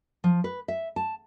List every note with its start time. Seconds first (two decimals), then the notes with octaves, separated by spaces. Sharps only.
0.24 F3
0.44 B4
0.68 E5
0.96 A5